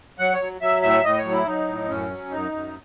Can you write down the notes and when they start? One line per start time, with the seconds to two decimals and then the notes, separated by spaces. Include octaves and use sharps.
0.19 F#3 F#5
0.33 C#5
0.40 F#3
0.61 F#3 E5
0.82 A2 E5
1.04 A2 D#5
1.18 C#5
1.24 F#3
1.32 E4
1.46 F#3 D#4
1.68 A2
1.89 F#2 C#4
2.10 F#3
2.30 F#2 D#4
2.52 F#2